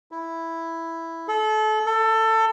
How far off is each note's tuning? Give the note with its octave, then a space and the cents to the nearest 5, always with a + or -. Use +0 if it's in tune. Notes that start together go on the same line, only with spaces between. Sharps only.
E4 +0
A4 -30
A4 +20